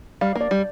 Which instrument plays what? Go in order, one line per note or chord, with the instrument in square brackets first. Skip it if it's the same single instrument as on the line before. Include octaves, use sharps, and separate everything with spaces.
[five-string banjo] G3 [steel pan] F5
[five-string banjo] A#3
[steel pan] D5
[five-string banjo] G3